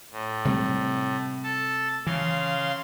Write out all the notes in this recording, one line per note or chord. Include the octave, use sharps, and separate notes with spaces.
A2
C3 G3 A3
A4 A5
C#3 E3 F5 C6